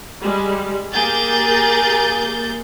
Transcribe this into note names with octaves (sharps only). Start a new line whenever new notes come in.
G3 G#3
A#3 G4 G#4 A#4 G6 A6